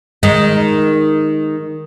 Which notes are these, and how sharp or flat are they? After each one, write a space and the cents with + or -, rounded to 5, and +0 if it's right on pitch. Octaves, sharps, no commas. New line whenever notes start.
D#3 +0 G#3 +0